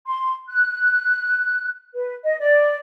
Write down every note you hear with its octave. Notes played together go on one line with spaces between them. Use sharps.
C6
F#6
B4
D#5
D5